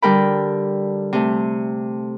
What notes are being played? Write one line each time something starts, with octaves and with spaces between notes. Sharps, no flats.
D3 G3 A#4 G5 B5
C3 A3